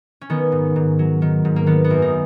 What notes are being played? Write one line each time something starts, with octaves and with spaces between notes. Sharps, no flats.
C#4
D#3 B3
G#2
G#2
F#3
D#3
G#2
A#3
D#3 B3
B3
F#2
D#4